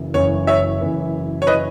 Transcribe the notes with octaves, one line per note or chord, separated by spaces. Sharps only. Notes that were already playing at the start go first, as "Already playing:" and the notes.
Already playing: F#1 F#2 E3
F#1 F#2 E3 C#5
C#5 E5
F#1 F#2 E3
C#5
E3 B4 D#5